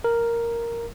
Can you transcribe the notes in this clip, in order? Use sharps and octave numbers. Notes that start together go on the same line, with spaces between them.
A#4